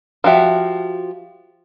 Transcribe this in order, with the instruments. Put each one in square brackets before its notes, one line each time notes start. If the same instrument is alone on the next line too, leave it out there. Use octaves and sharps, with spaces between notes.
[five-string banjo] F3 F#4 G4 E5